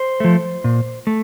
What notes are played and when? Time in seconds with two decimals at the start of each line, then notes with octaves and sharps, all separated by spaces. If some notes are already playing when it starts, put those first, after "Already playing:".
Already playing: C5
0.20 F3 A3
0.64 A#2
1.07 A3